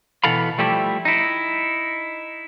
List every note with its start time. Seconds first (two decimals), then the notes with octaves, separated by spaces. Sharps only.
0.24 B2 E3 B3 A4 F5 B5
0.58 F3 G3 A3 E4 G4
1.05 D#4 E4